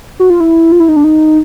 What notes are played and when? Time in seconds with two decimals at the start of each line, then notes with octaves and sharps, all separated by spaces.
0.20 F#4
0.30 F4
0.40 E4
0.72 F4
0.80 E4
0.89 D#4
0.96 D4
1.04 D#4